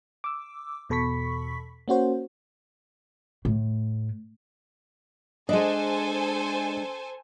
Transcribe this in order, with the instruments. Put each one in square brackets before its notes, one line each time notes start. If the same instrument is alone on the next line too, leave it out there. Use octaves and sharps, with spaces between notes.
[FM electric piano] D6 E6
E2 B2 A4 B5 C#6 B6
A#3 C#4 F#4 C5
[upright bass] A2
[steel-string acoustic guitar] G#3 D4 [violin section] A4 C5 G#5 [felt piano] D#5